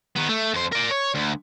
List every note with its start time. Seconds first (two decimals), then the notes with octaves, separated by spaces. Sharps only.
0.16 D#3 B3
0.29 A3
0.54 F2 C5
0.72 A#4 D5
0.91 C#5
1.15 D2